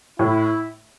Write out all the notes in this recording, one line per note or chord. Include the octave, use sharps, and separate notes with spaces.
A2 E4